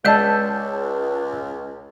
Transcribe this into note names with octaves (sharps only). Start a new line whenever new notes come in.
C#2 G#3 D5 D#5 A5 E6 G6